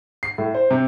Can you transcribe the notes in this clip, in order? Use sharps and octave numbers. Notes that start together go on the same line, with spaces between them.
C7
A2
C5
C3